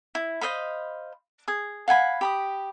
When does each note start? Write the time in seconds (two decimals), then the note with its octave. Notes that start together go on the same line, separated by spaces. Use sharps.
0.15 E4
0.41 C5 D#5 F5 B5
1.48 G#4 D#6
1.88 F5 F#5 G#5 B5
2.21 G4 B5 D#6